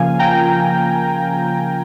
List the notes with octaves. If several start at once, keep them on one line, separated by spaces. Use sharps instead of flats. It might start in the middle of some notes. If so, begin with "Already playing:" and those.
Already playing: C#3 F3 A#3 F4 F5 G#5
G5 A#5